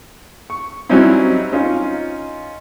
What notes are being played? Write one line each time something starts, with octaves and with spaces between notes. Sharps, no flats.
C#6
F#3 G3 C4 C#4 D#4 E4
C#4 D#4 F4